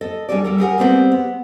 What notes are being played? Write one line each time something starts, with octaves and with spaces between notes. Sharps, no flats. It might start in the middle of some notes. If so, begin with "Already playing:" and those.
A4 D#5
G3 D4 G#4 A4 D5
G3 A4 A#4
G4 G#4 A#4 F#5
G3 B3 C4 E4 B4 C5
B3